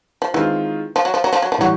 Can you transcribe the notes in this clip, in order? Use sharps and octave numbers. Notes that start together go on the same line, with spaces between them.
F3
D#3 E3 G#3 C4 F4
F3
F#3
F3
F#3
F3
F#3
F3
A2 E3 F#3 G3